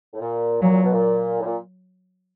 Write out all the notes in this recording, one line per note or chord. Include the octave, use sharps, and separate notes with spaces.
A2
A#2
A#2 F#3
A#2
B2
A#2
A2
A#2